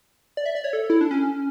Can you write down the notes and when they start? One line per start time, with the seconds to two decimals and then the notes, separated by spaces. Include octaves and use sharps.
0.37 D5
0.46 E5
0.55 D5
0.64 C#5
0.73 A4
0.90 E4
1.01 D4
1.11 C#4